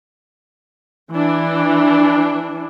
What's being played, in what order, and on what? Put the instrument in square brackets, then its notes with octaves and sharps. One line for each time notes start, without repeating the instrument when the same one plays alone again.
[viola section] E3 D4